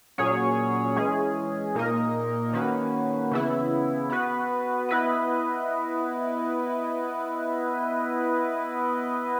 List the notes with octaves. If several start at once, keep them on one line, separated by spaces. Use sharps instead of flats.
A#2 F#3 C#4 G#4 C#5
E3 G#3 C#4 G#4
A#2 A#3 D#4 A#4 D#5
D#3 A#3 C#4 F#4 B4
C#3 E3 B3 E4
B3 F#4 B4
B3 E4 B4 D#5